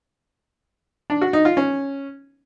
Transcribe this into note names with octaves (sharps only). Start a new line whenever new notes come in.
D4
F#4
D#4
F4
C#4